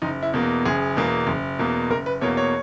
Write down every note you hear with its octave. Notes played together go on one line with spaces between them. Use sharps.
F#1 D#4
E4
E2 B2 A#3
F#1 G#4
E2 B2 A#3
F#1
E2 B2 A#3
F#1 A#4
B4
E2 B2 A#3 C#5
C#5